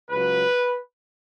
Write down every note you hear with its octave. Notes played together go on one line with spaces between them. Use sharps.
C#2 C#3 F#3 B4